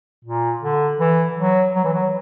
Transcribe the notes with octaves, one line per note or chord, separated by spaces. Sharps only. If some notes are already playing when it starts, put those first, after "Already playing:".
A#2
D3
E3
F#3
F#3
E3
F#3